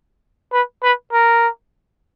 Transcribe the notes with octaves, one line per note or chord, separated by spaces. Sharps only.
B4
B4
A#4